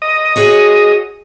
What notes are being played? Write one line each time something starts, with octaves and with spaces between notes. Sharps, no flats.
D#5
F#4 G#4 C#5